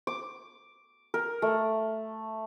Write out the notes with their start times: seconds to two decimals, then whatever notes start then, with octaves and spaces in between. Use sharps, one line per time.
0.07 D6
1.14 A#4
1.42 A3